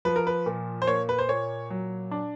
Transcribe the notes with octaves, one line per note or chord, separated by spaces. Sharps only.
F3 B4
A#4
B4
A#2
C5
A#3 C#5
B4
C5
A#2 C#5
F#3
D4